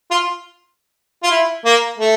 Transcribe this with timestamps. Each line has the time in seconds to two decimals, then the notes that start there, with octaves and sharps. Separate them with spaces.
0.11 F4
1.23 F4
1.31 E4
1.65 A#3
1.98 A3